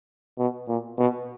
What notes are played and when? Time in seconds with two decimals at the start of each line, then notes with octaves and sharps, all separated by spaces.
0.38 B2
0.68 A#2
0.98 B2